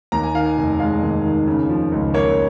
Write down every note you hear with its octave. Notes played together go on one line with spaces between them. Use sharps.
D#2 A#5
G#5
D#3 F5
G#5
F1
G#3 F5
D#2
D#3
C#3
F3
C#2
A#3 C#5